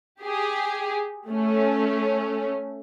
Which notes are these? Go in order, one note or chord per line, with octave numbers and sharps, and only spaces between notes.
G4 G#4
A3 C#4